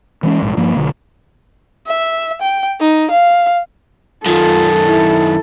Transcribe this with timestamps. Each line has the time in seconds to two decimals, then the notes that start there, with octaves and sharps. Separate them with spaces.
0.23 E3 G#3 C#4
0.42 A#1 G#2
0.57 G2 F3 A#3
0.76 B1 D3
1.87 E5
2.41 G5
2.80 D#4
3.11 F5
4.26 F#2 D#3 F4 A4
4.86 E4